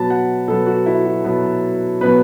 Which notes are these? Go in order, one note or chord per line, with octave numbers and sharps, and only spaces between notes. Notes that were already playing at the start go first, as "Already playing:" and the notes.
Already playing: B2 F#3 B3 A5 B5
F#5
B2 F#3 B3 A4
F#4
E4
F#4
B2 F#3 B3
B2 F#3 B3 B4